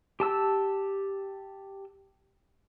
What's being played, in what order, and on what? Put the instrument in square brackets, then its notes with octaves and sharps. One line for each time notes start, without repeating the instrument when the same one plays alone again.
[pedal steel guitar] G4 A5 E6